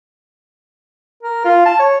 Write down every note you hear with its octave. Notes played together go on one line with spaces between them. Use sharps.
A#4
F4
A5
C#5